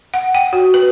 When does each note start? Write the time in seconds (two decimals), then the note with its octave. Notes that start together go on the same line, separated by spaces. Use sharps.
0.14 F#5
0.35 G5
0.53 F#4
0.74 B4